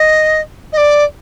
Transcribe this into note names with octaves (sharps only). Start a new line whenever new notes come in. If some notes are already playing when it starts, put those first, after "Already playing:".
Already playing: D#5
D#5
D5